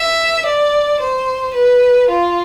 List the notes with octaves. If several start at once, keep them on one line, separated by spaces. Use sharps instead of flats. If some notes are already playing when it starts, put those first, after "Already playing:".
Already playing: E5
D5
C5
B4
F4